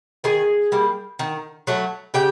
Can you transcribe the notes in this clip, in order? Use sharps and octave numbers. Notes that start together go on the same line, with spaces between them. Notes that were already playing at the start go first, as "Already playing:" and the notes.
D#3 G#4 G#5
G3 A#3
D#3
F#3 A3
C#3 G4 G5